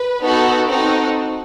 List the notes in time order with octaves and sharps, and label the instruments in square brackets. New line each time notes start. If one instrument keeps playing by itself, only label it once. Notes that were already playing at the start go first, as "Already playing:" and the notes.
Already playing: [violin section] B4
B3 D#4 F#4 A4
C4 D#4 F#4 A4